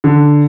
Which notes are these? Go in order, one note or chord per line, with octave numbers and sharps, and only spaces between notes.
D3